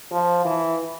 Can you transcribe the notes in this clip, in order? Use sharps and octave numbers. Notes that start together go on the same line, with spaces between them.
F3
E3